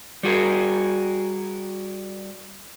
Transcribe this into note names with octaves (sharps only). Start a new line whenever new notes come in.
G3 F#4 G#4 A#4